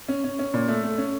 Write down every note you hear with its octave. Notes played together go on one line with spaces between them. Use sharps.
C#4
C#4
C#4
A#2
A3
A3
C#4